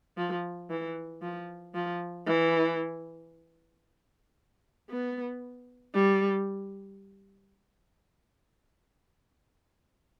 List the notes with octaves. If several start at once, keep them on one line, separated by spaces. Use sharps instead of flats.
F3
E3
F3
F3
E3
B3
G3